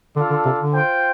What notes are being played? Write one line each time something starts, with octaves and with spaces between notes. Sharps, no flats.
D3 D4 F4 A4
D3
C3
D3
F4 C5 G5